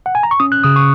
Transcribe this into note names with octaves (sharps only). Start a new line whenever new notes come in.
F#5
G#5
A#5
C#6
C#4 D#6
F#6
C#3 D#6
C#6